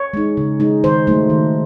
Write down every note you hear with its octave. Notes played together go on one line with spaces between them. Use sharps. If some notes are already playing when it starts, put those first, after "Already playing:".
Already playing: C#5
G#3 D#4
C#3
G#3 D#4
D#3 C5
F#3 A3 D#4
D#3